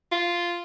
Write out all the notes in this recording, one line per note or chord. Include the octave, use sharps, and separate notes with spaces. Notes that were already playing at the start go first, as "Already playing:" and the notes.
F4